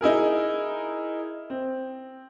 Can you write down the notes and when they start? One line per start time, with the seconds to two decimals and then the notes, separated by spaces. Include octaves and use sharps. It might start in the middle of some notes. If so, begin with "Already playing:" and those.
0.01 D#4 E4 G#4 A#4
1.50 C4